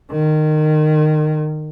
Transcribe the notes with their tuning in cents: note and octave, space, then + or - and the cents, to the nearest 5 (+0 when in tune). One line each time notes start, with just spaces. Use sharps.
D#3 -20